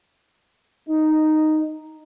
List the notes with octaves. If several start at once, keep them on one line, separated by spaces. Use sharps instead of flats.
D#4